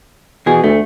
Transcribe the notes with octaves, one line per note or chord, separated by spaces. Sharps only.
B2 E3 G#4
D2 A3